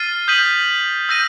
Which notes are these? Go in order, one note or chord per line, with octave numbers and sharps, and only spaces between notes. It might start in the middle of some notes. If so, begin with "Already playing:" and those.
Already playing: F6 A6 C7 D#7
D#6 G6 B6 D#7 F#7
E6 G6 A#6 D#7